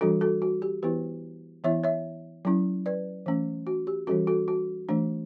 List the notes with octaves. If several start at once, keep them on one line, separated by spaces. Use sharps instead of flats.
E3 G3 D4 F#4 A4
F#4 A4
F#4
G4
E3 B3 E4 G4 B4
E3 B3 E4 C#5 E5
C#5 E5
F#3 C#4 E4
B4 D5
E3 A3 C#4
F#4
G4
E3 G3 C#4 F#4 A4
F#4 A4
F#4
E3 A3 D4